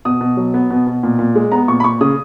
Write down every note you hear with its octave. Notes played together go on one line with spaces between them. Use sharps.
B2 D#6
B2
F#3
B3
B2
B2
A#2
A#2
G#3
B3 A#5
A#2 C#6
B5
A#2 C#6
C#3 D#6